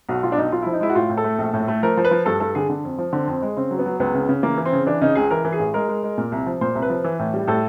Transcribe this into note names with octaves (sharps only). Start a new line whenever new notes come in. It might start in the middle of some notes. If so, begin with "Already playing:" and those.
B1 F#4
B1 F4
D4
B1 D#4
B1 F4
F3 E4
D#4
G#3 E4
F#4
A2 F4
A2
A4
A3
A#1
A2
A3
F3 A#4
F3
B4
F3
G2 A4
G2 A4
D3 G#4
D3
F2
F3
D3 C4
F2
G#3
C#3 C4
F#3
B3
F#3
C#2 B3
C#3
C#3
E3 A#3
E3
C4
C#3
E3 D4
C#3 D#4
C#2 G#4
E3 A#4
E3
G#4
A1
G#3 A#4
G#3
G#3
A#2
C2
F3
A#2 C5
C2
B4
F3
E3
A2
G3
A2 A4